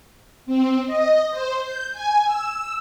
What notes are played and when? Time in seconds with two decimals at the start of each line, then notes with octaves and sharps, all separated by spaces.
0.46 C4
0.86 D#5
1.31 C5
1.63 G6
1.93 G#5
2.25 E6